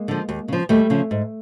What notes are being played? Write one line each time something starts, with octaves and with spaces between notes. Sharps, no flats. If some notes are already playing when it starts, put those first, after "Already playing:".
Already playing: G#3 A#3
D3 F3
D#2
C#3 F3
D#2 G3 A3
C#3 F3
G#2